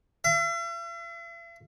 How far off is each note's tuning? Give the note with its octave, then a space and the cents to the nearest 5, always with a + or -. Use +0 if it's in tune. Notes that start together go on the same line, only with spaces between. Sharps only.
E5 +45